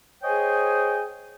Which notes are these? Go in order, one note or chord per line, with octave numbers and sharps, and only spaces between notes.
G#4 C5 C#5 D#5 G5 G#5